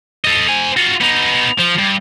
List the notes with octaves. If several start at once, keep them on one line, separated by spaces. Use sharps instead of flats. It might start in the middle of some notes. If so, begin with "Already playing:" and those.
A4 D#5
C5 G#5
F4 F#4
B3 D#4
F3
G2